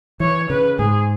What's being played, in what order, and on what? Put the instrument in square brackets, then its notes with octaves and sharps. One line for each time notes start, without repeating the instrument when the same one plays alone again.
[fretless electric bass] E3 [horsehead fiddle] C#5
[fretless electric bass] C#3 [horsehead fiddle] B4
[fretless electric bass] G#2 [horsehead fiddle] G#4